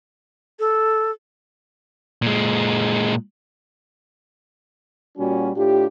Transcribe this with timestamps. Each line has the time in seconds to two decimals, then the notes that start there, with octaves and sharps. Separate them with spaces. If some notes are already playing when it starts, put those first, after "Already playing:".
0.59 A4
2.22 A#2 G#3
5.18 A#2 G3 C#4 F#4
5.56 A2 D4 F4 G4